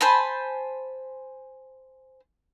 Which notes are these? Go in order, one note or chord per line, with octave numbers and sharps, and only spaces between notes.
C5 G#5 A5 B5